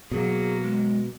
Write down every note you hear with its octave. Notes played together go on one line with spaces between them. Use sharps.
B2 F#3 A#3 G#4
G#3